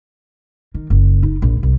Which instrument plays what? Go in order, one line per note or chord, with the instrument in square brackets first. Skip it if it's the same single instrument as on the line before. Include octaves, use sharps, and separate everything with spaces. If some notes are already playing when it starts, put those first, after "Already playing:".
[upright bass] D#3
F#1
D#4
A#1
C2